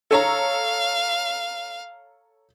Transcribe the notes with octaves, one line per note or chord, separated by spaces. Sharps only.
A4 C#5 F5 A#5